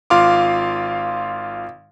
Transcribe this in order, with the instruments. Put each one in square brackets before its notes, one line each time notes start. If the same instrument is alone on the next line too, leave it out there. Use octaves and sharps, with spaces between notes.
[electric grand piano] G#1 F4 F5 C6 D6